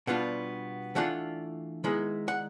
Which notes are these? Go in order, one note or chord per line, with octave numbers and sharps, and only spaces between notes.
B2 G3 B3 D4 F4 F#5
E3 A3 D4 F4 F#5
D#3 G#3 B3 E4
F#5